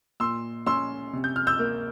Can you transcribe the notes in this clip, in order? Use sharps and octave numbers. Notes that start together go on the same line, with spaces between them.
A#2 C6 E6
C#4 C6 E6
C3
G6
F6
E6 G6
A#3